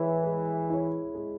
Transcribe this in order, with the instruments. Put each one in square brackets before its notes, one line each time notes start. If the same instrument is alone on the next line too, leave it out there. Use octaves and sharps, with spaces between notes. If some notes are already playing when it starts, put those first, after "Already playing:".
Already playing: [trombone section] E3 [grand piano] G#3 E4 C#5
[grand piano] G#3
E4 C#5
G#3